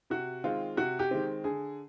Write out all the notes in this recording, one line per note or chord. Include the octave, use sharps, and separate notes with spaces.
C3 F#4
D#3 G#3 C4 F4
C3 F#4
G4
D#3 G#3 C4
D3 G#4